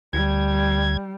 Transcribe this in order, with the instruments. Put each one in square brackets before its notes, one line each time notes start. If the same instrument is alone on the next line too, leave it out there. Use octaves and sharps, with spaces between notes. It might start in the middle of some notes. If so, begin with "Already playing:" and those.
[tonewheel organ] D2 G#6 [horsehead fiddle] G3